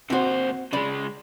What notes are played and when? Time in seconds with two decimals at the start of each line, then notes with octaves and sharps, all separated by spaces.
0.10 D#2 C4 F#4 C5
0.73 C#3 G#3 D5 B5